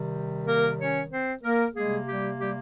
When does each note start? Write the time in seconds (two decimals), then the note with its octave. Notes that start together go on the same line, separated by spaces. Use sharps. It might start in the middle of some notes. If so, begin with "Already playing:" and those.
Already playing: C3 D#3 G3
0.46 A#3 A#4
0.80 C#4 C#5
1.11 C4 C5
1.43 A#3 A#4
1.74 C3 G3 G#3 A#3 G#4
2.06 G3 G4
2.39 G3 G4